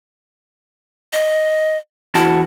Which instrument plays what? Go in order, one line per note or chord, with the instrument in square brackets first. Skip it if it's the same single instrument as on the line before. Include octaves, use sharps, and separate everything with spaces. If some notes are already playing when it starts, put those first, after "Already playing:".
[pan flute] D#5
[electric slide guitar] E2 F#4 A5 [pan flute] E4